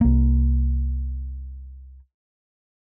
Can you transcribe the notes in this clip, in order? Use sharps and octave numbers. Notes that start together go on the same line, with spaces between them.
C2 A#3